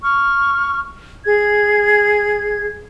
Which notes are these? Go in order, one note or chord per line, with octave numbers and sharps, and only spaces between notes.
C#6 F6
G#4 G#6